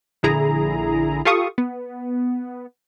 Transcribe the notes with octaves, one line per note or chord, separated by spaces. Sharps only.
A#1 D3 E4 G#4 A#5
F4 G4 A4 F5 C#6 D#6
B3